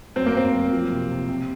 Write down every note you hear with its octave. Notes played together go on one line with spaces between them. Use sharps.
F#2 C4
A#3
F#2 C4
F#2
F3
C3
C3
C3